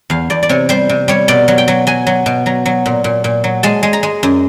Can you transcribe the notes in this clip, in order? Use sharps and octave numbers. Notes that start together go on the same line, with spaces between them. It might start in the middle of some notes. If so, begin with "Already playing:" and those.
E2 F5
E2 D5
D5
C3 C#5
G3 C5
C3
G3 C#5
B2 D5
F#3
G5
F#3
F#3 G#5
F#3
B2
F#3 A#5
F#3
A#2
A#2
A#2
F#3
G#3 A5
G#3
A#5
G#3
F#2